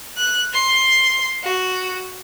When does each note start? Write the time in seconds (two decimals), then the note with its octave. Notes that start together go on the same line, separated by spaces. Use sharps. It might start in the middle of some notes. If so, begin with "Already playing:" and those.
0.17 F#6
0.53 C6
1.44 F#4